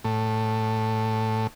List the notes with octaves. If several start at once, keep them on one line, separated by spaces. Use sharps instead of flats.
A2